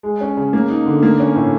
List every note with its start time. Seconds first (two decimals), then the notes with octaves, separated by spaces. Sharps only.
0.03 G#3
0.21 C#4
0.37 C#3
0.53 A#3
0.70 D#4
0.86 D3
1.03 A#3
1.20 C#4
1.35 A2